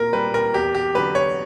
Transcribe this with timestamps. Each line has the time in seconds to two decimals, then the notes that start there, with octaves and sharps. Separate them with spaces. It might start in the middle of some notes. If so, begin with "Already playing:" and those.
Already playing: A#2 A#4
0.13 G3 B4
0.34 A#4
0.54 E2 G4
0.75 G4
0.94 D3 F#3 B4
1.15 C#5